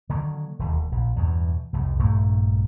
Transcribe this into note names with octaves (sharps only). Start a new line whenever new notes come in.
D3 D#3 F#3 A#3
E1 D#2
A#1
E2 G2 B2
C2 F2 A2
A#1 G2 A3 A#3